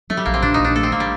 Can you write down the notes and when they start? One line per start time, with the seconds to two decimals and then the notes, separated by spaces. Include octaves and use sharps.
0.10 F#3 A3
0.17 G3
0.26 A#1 A#3
0.34 C4
0.42 A#2 D4
0.54 D#4
0.60 A#1 D4
0.75 A3 A4
0.83 C4
0.92 A#3
1.00 G3